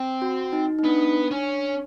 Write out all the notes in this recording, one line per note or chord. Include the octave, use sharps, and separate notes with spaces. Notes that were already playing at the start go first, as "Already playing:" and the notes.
Already playing: C4
F#4
D#4
D#4
B3 D4
C#4